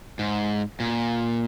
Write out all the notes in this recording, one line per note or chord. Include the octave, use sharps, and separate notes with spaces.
G#2
A#2